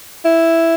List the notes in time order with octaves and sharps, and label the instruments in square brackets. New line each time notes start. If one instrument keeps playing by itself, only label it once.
[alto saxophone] E4